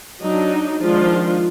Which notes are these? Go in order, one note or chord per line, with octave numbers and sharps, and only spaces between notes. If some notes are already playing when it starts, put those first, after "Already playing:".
F#3 D4 D#4
D#3 F3 G#3 D4 F4